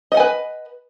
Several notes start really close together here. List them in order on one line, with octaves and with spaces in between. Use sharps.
D#5 F#5 G#5 B4